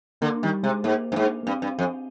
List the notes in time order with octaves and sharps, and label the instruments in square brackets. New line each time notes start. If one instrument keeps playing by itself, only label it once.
[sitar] D3 [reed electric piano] A#3
[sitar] D#3 [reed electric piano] G3
[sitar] C3 [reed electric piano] G#3
[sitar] G#2 [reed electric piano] A#3
[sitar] G2
G#2
[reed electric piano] A#3
[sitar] G2 [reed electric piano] C4
[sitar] G2
F2